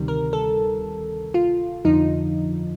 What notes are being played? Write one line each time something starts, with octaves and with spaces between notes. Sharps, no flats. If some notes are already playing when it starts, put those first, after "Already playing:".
Already playing: D2 C3 D#3 G3
A#4
A4
F4
G1 F2 D3 F3 D#4